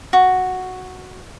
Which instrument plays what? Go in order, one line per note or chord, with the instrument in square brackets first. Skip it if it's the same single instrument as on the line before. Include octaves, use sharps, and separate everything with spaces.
[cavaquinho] F#4